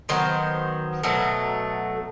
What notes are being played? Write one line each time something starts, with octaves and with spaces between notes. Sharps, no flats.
D#3 F#3 B3 C5
B2 F#3 A3